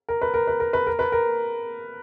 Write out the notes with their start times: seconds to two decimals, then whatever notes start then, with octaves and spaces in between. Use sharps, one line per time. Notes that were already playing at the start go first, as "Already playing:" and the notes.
0.09 A#4
0.22 B4
0.34 A#4
0.47 B4
0.60 A#4
0.73 B4
0.87 A#4
0.99 B4
1.12 A#4